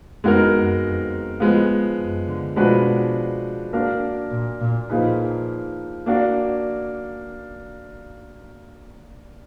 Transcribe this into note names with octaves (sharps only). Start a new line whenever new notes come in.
F2 G#3 B3 D#4 F#4 A#4
F#2
F2
F3 G#3 B3
F#2
D3
B2 F3 G#3 D4 F#4 B4
A#3 D4 F#4 A#4
A#2
A#2
A#2 F3 A#3 D#4 G#4 B4
A#3 D4 F#4 D5